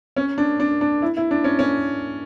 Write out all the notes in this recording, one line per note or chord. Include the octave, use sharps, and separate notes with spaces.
C#4
D4
D4
D4
E4
E4
D4
C#4
C#4